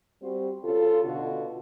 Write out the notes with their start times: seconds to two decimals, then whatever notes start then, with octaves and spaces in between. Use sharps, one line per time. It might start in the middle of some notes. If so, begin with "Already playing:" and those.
0.22 G3 C4 F#4 C5
0.63 C#3 F4 A4
1.04 B2 D3 F4 F#4